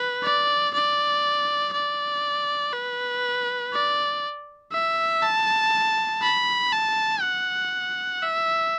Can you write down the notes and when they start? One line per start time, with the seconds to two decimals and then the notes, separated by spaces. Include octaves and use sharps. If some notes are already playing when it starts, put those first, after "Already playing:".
Already playing: B4
0.23 D5
0.74 D5
1.73 D5
2.73 B4
3.73 D5
4.73 E5
5.23 A5
6.22 B5
6.72 A5
7.22 F#5
8.22 E5